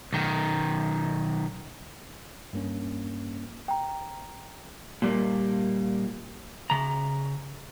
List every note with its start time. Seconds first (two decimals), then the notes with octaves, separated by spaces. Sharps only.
0.12 B1 D#3
2.53 G2 A#3 C#4
3.68 G5 A#5
5.02 A#2 G3 A#3
6.70 C#3 A#5